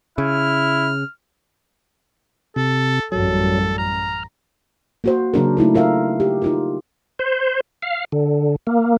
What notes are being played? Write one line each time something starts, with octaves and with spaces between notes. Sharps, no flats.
C#3 E4 F6
C3 A4
A1 F#2 F#3 G3 A4
A#5 F6
A#3 F#4 C5
C#3 F#3 A#3 D4 G#4 A#4
A3 D#4 E4 A#4
F4 A#4 E5 F5
G4
D#4 F4 A#4
C5
F5
D3
A#3